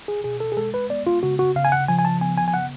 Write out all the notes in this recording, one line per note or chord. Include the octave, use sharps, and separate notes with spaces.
G#4
B2 G#4
A4
G#4
G#3 A4
B4
B3 D5
F4
C#3 F#4
F#4
C#3 F5
G#5
F#5
F3 G#5
G#5
A5
B3 G#5
G#5
G#5
C#3 F#5